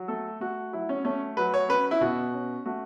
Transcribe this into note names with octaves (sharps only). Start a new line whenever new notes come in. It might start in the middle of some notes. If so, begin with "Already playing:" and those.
Already playing: F#3
A3 A4
A3 F#4
F#3 E4
C#4
A3 C#4
F#3 B4
C#5
C#4 B4
E4
B2 F#4
C#4
A3 F#4